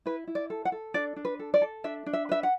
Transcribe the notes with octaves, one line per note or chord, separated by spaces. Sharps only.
E4 B4
E4
D5
A4
F#5
A4
D4 D5
D4
B4
A4
D5
A4
D4 E5
D4
E5
B4 E5
F#5